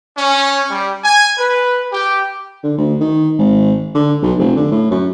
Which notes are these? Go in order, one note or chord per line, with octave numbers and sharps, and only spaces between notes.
C#4
G3
G#5
B4
G4
D3
D2
D#3
G#1
D3
B1
F1
D3
A2
F#2